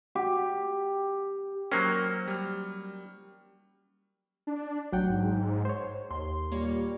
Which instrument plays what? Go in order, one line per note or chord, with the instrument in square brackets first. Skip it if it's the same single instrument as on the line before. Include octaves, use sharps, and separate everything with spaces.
[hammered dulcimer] G4
[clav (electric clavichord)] F#3 A#3 C#4 [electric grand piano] A#4 C5 G5
[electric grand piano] G3 F6
[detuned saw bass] D4
[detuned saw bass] A1 [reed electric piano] F#3 F#5 G5
[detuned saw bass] G#2
[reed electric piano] C5 C#5
[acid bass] D#2 [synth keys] C6
[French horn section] A#2 G3 [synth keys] A#3 C#5